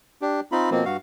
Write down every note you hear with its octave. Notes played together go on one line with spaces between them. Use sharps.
D4 G4
C4 D#4 F4 B5
B2 F3 A#3 C4
G2 F#4 F5